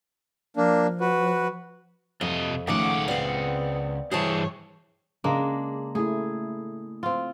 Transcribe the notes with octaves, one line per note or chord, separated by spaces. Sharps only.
F3 A#3 D4
F#4 B4
F2 C3 D#5
C#2 D#3 F3 A3 C#4 F#5 D6
B3 C4 D5 F5
G2 E3 G#4 C5 C#5 A5
C#3 G#3 A#3 D4
A3 E4 G#4
C4 F4